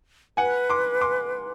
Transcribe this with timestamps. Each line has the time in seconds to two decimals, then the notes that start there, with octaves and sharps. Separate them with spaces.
0.37 B4 F#5 G#5
0.70 C6 D6
1.01 C6 D6